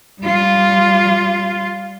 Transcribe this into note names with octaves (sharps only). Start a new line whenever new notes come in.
G3 F4